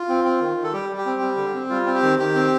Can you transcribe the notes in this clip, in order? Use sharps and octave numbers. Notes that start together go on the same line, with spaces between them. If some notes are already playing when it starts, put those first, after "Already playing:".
Already playing: F4
C4
C4
D#3
D#3
A4
G3 G4
G3
G4
C4
G3
D3
C4
G3 F4
C4
G4
D#3
D#3 G4
C4